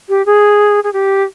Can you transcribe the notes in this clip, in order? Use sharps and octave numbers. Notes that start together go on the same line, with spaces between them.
G4
G#4
G#4
G4